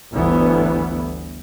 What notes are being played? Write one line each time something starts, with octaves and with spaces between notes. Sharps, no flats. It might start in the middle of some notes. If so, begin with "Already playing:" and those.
G1 D2 E3 B3